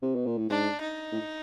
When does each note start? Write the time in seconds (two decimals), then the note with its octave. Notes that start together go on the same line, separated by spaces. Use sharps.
0.02 C3
0.15 B2
0.26 A#2
0.38 A2
0.50 G#2 D4
0.81 D#4
1.12 A2